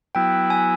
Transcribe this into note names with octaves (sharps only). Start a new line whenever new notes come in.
F#3 B3 E4 G5
G#5